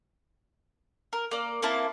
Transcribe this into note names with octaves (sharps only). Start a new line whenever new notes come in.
A#4
A#3 D5
A#3 C4 E4 A5